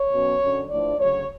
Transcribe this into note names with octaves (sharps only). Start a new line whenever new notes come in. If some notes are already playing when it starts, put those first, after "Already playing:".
Already playing: C#5
B2 F#3 C#4
F#2 D3 F#3 C#4
A2 F3 A3 D4 D5
D2 C#3 F#3 C#5